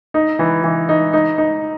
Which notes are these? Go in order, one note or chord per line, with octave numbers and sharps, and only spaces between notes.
D#4
E3
E3
D#4
D#4
D#4